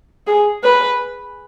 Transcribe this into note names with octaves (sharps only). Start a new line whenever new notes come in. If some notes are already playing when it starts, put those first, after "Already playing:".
G#4
B4